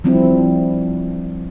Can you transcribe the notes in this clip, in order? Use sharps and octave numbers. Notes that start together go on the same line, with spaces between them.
F3 G3 C4 D4 E4